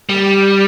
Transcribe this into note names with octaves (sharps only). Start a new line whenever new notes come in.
G3